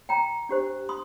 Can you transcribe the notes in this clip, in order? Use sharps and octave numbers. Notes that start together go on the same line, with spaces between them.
G5 A#5
D4 G4 C5
C6 D#6